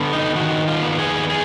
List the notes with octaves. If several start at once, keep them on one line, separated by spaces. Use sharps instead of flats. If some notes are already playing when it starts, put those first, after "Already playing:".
Already playing: D3 B3
D#4
D#3 F#4
F4
B3
G#4
G#4